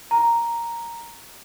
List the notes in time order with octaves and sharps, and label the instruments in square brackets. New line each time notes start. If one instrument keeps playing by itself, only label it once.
[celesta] A#5